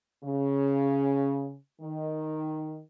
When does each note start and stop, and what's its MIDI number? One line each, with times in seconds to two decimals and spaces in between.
0.23 1.55 49
1.82 2.80 51